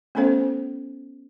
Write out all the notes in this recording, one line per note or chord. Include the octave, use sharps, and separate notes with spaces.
A3 B3 C#4 A4 C5